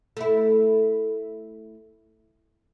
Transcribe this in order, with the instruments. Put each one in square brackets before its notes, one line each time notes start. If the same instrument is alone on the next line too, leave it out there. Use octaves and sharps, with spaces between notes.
[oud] A3 E4